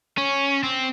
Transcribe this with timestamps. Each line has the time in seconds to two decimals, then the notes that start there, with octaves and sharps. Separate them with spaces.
0.18 C#4
0.63 C4